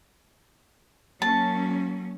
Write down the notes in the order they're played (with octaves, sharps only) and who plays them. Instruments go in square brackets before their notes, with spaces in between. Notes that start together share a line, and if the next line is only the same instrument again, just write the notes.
[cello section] F#3 A#3 C#4 [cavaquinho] A5